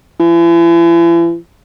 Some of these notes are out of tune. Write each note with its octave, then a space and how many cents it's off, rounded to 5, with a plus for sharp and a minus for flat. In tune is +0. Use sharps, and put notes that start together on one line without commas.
E3 +40